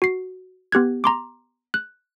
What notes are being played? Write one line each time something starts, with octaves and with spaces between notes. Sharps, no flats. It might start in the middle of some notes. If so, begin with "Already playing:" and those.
F#4 C7
B3 G4 F#6 G#6
A#5 C6 D6
F#6